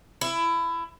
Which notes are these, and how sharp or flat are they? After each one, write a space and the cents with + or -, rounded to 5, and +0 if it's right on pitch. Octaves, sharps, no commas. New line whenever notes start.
E4 +20